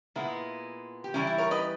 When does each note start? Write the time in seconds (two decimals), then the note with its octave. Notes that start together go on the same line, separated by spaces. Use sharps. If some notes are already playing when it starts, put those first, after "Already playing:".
0.16 A#2 G#3 B3 E4
1.04 G4
1.14 E3 G3 A#3 C#4 E4
1.27 E4
1.38 A#4 C#5
1.51 B4 D#5